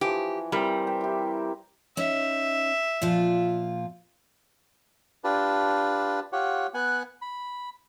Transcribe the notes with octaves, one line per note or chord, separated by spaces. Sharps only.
E3 F3 G4
G3 C4 E4 A#4
E5 G5
E4 G4
C#4 D#4 E5
A#2 F3 F4
D4 F4 G4 B4 A5
F4 G4 C#5 F#5
B3 F#5 G#5 F#6
B5